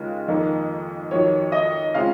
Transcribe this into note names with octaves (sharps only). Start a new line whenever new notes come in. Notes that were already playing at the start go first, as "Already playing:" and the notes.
Already playing: D#2 C#3 G#3 F4
F2 D#3 A#3 D#4
F2 D#3 F#3 C#5
D#5
C#3 G#3 C4 F4 F5